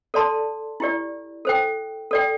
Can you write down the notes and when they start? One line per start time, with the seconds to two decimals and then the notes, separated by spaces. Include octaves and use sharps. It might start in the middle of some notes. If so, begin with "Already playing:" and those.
0.14 A4 D5 A5 C6
0.80 E4 G4 D5
1.45 A4 C5 G5
2.11 A4 D5 G5